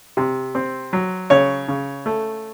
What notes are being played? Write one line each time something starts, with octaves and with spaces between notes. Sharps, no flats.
C3
C4
F#3
C#3 C#5
C#3
A3